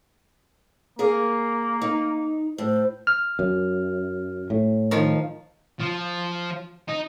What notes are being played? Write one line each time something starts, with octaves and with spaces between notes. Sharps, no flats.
A#3 G#4 A#4 F5
D#4
A2 C5
F6
F#2
A2
D#3 F3
F3
D#4